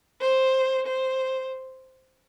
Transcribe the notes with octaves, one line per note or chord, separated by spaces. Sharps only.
C5
C5